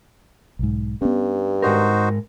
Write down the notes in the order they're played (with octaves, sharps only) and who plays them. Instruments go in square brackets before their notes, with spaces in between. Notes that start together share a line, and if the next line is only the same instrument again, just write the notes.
[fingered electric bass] B1 G#2
[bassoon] G2 [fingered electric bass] B3 C#4
[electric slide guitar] G#2 A#4 [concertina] D#4 F#4 C5